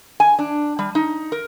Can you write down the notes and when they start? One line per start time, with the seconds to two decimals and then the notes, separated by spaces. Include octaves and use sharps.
0.20 G#5
0.39 D4
0.79 G3
0.95 D#4
1.32 A#4